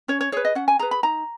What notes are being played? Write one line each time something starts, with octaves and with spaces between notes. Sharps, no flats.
C#4 C#5
C#5
G#4 B4 C#5
D#5
C#4 F#5
G#5
G#4 B4 A#5
B5
D#4 A#5